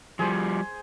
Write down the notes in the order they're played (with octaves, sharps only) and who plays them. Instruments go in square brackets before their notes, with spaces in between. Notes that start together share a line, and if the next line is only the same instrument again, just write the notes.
[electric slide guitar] F3 G3 [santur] G#4 C5